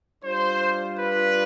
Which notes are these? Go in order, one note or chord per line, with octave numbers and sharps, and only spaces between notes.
G3 D4 F4 C5
B4